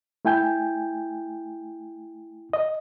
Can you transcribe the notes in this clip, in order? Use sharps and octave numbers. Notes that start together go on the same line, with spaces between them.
A3 E4 G5 G#5 G6
D#5